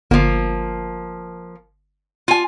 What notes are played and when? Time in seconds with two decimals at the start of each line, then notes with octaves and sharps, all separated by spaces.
0.11 G1 F3 A#3
2.28 F4 G#5